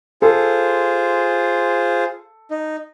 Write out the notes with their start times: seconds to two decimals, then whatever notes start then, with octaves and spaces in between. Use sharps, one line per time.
0.22 F4 G#4 A4 C5
2.51 D#4